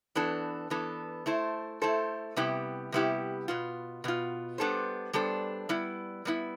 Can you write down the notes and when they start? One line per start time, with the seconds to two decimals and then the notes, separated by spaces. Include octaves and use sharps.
0.15 E3 B3 D4 A4
0.70 E3 B3 D4 A4
1.26 A3 E4 A4 C5
1.82 A3 E4 A4 C5
2.36 C3 G3 B3 E4 G4
2.92 C3 G3 B3 E4 G4
3.48 B2 B3 F4
4.04 B2 B3 F4
4.58 G3 B3 D4 A4 C5
5.13 G3 B3 D4 A4 C5
5.69 G3 B3 E4
6.25 G3 B3 E4